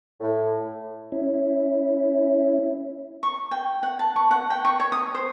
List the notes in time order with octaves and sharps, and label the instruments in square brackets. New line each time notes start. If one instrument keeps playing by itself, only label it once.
[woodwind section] A2
[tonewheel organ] C#4 E4
[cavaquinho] C#6
G5
F#5
A5
C#6
F#5
G5
C#6
C#5
D#6
C5